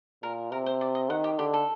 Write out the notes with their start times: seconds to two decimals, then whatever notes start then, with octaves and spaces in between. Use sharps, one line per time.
0.23 A#2 A#4
0.51 C3 A#4
0.66 C5
0.81 D5
0.95 D#5
1.10 D#3 F#5
1.24 G4
1.39 D3 G4
1.53 A4